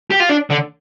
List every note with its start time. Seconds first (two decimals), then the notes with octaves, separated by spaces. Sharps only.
0.11 G4
0.20 F4
0.30 D4
0.50 D3